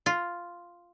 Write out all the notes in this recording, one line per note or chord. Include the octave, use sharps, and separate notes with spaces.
F4